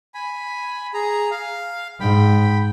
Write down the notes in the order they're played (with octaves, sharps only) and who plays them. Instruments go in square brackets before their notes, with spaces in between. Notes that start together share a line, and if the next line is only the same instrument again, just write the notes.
[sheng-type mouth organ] G#5 B5
G#4 A#5
F5
[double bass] G#2 [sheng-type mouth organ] G5 B5